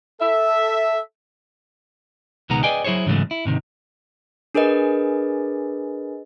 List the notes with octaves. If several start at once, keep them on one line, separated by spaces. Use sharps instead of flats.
A4 E5
C#2 B2 D#3 G#3 B3 A#5
G#4 B4 D5 D#5 G5 G#5
F#3 E4 G#4 C5 C#5
G#2 C#3 E3 F#3 G#3 A3
E4
G#2 C3 D#3
D4 G#4 A#4 B4 D#5